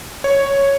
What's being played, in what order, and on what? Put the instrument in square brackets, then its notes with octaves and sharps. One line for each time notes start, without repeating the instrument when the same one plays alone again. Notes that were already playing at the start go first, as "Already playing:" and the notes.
[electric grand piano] C#5